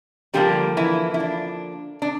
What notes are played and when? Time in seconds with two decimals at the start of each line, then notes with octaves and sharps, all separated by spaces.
0.34 D3 F3 G3 A#3 G4
0.77 E3 E4
1.14 E4
1.20 D4
2.02 D4